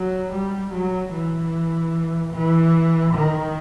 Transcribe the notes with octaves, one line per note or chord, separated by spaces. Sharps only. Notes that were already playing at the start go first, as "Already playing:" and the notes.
Already playing: F#3
G3
F#3
E3
E3
D#3